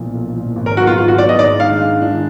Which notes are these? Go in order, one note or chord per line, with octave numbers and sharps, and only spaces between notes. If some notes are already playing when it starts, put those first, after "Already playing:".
Already playing: B1 A#2 F3
B1
A#2 F3
G#1
A#4
G#2 F#3 B3 F#4
F4
G#1 F4
F#4
G#2 F#3 B3 D5
D#5
G#2 D5
D#3 G#3 D4 F5
G#2
D#3 G#3 D4